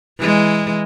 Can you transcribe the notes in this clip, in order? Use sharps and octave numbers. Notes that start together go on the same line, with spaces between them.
E3 G#3